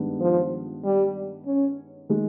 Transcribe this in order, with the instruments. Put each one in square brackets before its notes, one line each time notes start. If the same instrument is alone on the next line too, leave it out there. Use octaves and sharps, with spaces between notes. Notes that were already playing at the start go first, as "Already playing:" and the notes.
Already playing: [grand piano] G2 D#3 G#3 B3 D4
[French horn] F3
G3
C#4
[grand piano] D#3 G#3